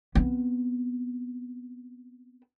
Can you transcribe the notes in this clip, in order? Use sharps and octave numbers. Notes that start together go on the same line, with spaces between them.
B3 C4